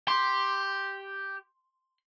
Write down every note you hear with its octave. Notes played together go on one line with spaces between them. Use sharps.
G4 C6